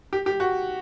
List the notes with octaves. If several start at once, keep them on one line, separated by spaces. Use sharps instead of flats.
G4
G4
F#4